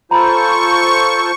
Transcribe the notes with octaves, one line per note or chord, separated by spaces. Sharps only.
F4 A4 C5 A#5 B5 C#6